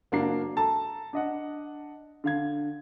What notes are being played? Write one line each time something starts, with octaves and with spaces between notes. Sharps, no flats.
F#1 A#3 D4 F#4 A#5 C7
A4 A5 A#5
D4 D#5 F#5
D3 F5 G#6